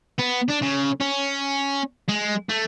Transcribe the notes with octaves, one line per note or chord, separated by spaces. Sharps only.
B3
D4
C#3
C#4
G#3
A3